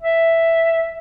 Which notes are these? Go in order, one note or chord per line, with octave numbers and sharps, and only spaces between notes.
E5